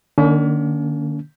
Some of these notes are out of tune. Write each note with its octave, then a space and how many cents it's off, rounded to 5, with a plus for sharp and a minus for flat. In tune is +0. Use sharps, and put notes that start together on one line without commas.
D3 +45 A#3 -10 C#4 +40